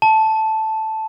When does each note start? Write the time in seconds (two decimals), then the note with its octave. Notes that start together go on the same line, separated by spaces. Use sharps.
0.02 A5